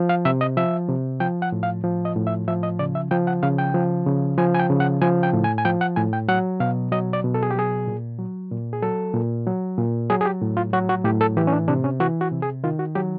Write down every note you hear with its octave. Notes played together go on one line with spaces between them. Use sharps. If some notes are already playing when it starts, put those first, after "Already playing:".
Already playing: F3
F5
C3 E5
D#5
F3 E5
C3
F3 G5
F#5
A2
F5
F3
D#5
A2
E5
F3 E5
D#5
C#3 D5
E5
F3 G5
F#5
C#3 F5
G5
F3
C#3
F3 G#5
G#5
G5
C#3
F#5
F3 G#5
G5
A2
G#5
G#5
F3 G5
F#5
A2 G#5
G5
F#3 F#5
B2 F5
F#3 D#5
D5
B2
A4
G#4
G4
F#3 G#4
A#2
F#3
A#2
G#4
F#3 A4
A#2
F#3
A#2
F#3 G#4
G#4
G4
A2
F4
F#3 F#4
F#4
A2 G4
A4
E3 G4
C#4
D4
C3 D4
C#4
E3 F#4
F#4
C3
G#4
D#3 F4
F#4
F#3 G4